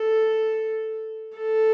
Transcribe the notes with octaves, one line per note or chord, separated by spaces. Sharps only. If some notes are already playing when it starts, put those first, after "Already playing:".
Already playing: A4
A4